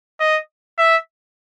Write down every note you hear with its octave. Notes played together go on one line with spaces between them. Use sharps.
D#5
E5